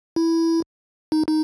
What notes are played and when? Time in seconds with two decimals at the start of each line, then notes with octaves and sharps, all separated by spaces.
0.16 E4
1.12 D#4
1.28 D#4